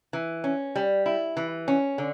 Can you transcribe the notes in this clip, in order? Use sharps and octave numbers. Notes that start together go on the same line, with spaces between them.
E3
C#4
G3
E4
E3
C#4
D3